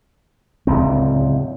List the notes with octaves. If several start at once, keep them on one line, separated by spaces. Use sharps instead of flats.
D1 G1 C#2 C4